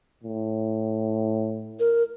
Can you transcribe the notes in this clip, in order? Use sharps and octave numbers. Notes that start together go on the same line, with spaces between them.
A2
A#4